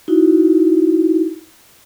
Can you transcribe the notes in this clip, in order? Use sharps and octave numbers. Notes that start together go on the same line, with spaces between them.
D#4 E4 F#4